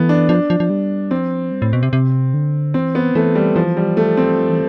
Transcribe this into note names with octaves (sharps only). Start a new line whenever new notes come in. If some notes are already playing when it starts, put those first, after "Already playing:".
Already playing: E3 A3 B3
D4
F3 D4
F3
F3
G3
F3 C4
G3
A2
B2
C3
C3
D3
E3 C4
B3
E3 A3
G3
E3 F3
G3
A3
C4
F3
E3